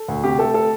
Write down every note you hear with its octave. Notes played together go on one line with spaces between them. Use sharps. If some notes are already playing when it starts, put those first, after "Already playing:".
Already playing: A4
D2
C3 G4
A3 A4
A4